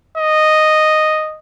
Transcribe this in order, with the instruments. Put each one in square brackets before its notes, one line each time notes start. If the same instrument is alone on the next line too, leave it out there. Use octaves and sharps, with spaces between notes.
[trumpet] D#5